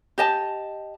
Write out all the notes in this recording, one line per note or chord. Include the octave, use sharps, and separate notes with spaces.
G4 D#5 A5